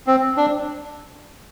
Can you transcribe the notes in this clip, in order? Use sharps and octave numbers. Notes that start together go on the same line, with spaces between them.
C4
D4